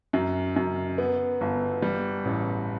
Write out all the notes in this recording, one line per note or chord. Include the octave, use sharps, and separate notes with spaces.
F#2
F#2
B3
G1
G3
A1